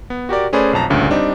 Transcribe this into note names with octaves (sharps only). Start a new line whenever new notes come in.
B3
F#4 G4 A#4 D5
A3 C#4 G#4 B4 C5 D5
B1 F2 A5 A#5
D2 G2 A#2 C#3 C#4
G3 C4 D4 D#4 G4